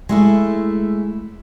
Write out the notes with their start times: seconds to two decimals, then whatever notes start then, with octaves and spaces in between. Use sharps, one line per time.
0.09 G#3 A3 E4